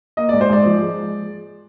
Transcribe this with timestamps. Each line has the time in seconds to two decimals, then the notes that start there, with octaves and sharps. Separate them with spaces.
0.17 A#3 D#5
0.29 G#2 D5
0.41 C5
0.49 G#2 D5
0.66 F3
0.81 G#3